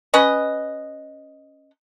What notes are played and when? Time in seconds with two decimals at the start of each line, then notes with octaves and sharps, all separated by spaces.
0.14 C#4 B4 D#5